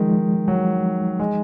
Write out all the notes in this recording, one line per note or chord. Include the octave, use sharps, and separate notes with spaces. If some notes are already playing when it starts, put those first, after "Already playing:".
Already playing: D#3 F3 G#3 D#4
F#3
G#3